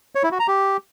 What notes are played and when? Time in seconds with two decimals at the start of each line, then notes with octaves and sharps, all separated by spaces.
0.15 C#5
0.23 E4
0.31 F#4
0.40 A#5
0.48 G4